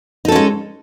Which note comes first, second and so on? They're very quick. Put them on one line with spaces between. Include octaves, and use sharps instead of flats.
D#4 A4 C#4 G#3